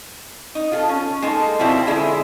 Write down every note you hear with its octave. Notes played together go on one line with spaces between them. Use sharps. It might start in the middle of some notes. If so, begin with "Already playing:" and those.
D#4
F4 G#4 A4
C#4
G#3 A#3 D#4 A4
B2 F3 G3 C4 E4 G4
D3 G#3 E4 G#4 E5